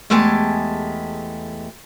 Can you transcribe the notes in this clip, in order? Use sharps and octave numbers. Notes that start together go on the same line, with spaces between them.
E2 G#3 A3 G4 G#5 A5